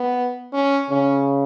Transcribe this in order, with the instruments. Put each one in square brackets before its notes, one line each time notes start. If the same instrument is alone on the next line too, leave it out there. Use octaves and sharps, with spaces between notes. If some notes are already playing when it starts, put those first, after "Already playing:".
Already playing: [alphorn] B3
C#4
[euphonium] C#3 [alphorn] C#4